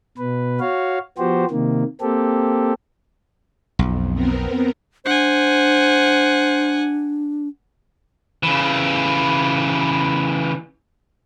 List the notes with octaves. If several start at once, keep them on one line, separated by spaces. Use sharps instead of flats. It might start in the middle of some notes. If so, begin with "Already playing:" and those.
B2 B4
F#4 C#5 F5
F3 B3 F#4 G4 C5
C3 D#3 A#3
A#3 C4 G4 A4
B1 F2
B3 C4 A#4
D4 C5 F#5 G#5
C#3 E3